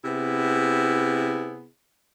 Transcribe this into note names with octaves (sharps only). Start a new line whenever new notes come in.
C3 B3 E4 G#4